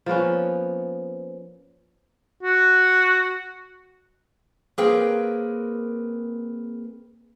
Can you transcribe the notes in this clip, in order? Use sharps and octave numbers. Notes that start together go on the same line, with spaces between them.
F3 A#3 B3 C#4
F#4
A#3 C4 G#4 A#4 B4 G5